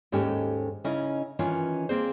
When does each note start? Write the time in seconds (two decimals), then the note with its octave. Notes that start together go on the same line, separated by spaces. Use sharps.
0.12 D#2 G#2 C#4 D#4 G4 A4
0.84 C#3 C#4 D#4 E4 D#5
1.39 D#3 E3 C#4 F4 C#5
1.89 A#3 C4 G#4 C5